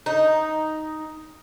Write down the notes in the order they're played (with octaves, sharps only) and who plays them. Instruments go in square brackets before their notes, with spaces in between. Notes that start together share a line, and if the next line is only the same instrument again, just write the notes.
[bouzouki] D#4